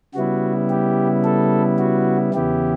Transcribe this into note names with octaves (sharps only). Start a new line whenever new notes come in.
C#3 G3 B3 E4 F#4
G4
A4
F#4
E2 C#3 E3 B3 E4 G4